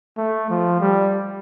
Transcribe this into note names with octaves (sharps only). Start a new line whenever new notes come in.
A3
F3
G3